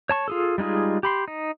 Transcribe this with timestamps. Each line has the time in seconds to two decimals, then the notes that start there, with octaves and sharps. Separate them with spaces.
0.09 C#5 A5 C#6
0.28 F4 G#4 A4
0.58 G3 G#3 D#4 F4 G#4
1.03 G4 B5 C6
1.28 D#4